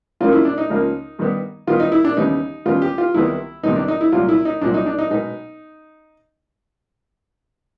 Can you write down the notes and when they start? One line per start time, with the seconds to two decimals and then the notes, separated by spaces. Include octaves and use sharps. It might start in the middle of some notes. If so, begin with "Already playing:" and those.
0.21 C#2 C#3 F3 A#3 F4
0.33 E4
0.45 D4
0.58 D#4
0.70 C#2 C#3 F3 A#3
1.19 G2 D#3 G3 B3
1.67 G2 D#3 G3 B3 F4
1.80 D#4
1.92 E4
2.05 D4
2.17 D#2 C#3 E3 G3 B3 D#4
2.65 D#2 C#3 E3 G3 B3 F4
2.82 G4
2.98 F4
3.14 C2 C3 D#3 G3 B3 E4
3.63 C2 C3 D#3 G3 B3 D#4
3.76 D4
3.88 D#4
4.01 E4
4.12 C2 A#2 F#3 F4
4.29 E4
4.45 D#4
4.61 C2 A#2 F#3 D4
4.74 D#4
4.86 D4
4.99 D#4
5.10 B2 G#3 B3 D#4